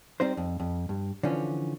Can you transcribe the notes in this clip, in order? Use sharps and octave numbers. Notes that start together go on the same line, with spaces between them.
G3 C4 D#4 C5
F2
F2
G2
D3 E3 F3 C#4